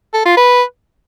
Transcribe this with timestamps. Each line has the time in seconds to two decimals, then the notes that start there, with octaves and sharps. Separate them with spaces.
0.14 A4
0.25 F4
0.37 B4